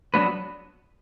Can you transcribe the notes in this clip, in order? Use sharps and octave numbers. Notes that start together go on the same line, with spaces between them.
F#3 B3 D4 F#4 B4